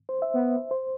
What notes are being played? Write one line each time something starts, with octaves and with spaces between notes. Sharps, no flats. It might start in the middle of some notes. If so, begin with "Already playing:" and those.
C5
E5
B3
C5